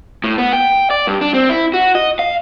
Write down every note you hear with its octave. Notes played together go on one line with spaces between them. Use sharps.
A2
B3
G5
D5
G2
D4
C4
E4
F#4
D#5
F5